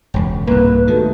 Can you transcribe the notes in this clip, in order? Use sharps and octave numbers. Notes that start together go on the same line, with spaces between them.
E1 C#2
C2 G#2 A#3 B4
D#3 A3 F#4 G4